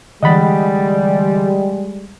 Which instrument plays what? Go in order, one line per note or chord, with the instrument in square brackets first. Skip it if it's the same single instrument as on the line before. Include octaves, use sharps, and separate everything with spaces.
[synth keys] D3 E3 A6 [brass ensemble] G3 G#3 [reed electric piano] D#5 F#5 B5